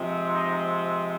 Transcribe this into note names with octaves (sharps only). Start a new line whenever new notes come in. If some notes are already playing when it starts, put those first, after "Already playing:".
Already playing: C3 F3 G#3 C4
D#4